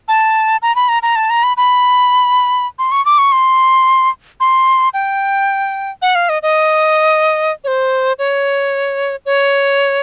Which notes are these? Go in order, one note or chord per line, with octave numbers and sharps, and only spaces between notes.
A5
A#5
B5
A#5
A#5
A5
A#5
B5
B5
C6
C#6
D6
C#6
C6
C6
G5
F#5
F5
D#5
D#5
C#5
C5
C#5
C#5